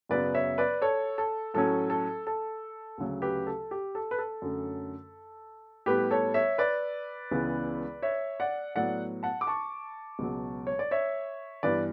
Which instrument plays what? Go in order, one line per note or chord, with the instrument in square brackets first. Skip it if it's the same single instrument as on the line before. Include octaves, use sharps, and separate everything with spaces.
[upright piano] F#2 C#3 F#3 B3 B4 D5
C#5 E5
B4 D5
A4 C#5
A4
A2 F#3 A3 C#4 A4
A4
A4
D2 C#3 F#3
G4 B4
A4
G4
A4
B4
A4
F#2 D3 A3 C#4
A2 G3 B3 G4 B4
A4 C#5
C#5 E5
B4 D5
C#2 C#3 E3 B3
C#5 E5
D5 F#5
A2 F#3 B3 D5 F#5
F#5 A5
D6
A5 C#6
C#2 B2 F#3
C#5
D5
C#5 E5
G2 E3 B3 B4 D5